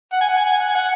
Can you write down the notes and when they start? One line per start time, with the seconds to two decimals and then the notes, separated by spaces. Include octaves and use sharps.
0.13 F#5
0.21 G#5
0.29 F#5
0.37 G#5
0.45 F#5
0.52 G#5
0.60 F#5
0.68 G#5
0.75 F#5